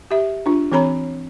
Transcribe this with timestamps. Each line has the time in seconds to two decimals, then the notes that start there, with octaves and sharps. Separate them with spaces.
0.11 G4 E5
0.46 D4 F4
0.72 E3 C4 C#5 A#5 B5